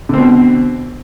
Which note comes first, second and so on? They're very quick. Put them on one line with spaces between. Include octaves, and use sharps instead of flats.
D3 C4 B2